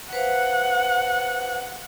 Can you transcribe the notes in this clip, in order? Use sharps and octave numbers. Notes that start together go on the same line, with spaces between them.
B4 C5 F5 F#5